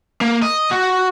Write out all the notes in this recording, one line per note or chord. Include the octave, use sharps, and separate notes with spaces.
A#3
D#5
F#4